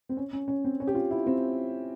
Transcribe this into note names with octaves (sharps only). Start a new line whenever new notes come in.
C4
C#4
C#4
C#4
C4
C#4
G4
F4
E4
C4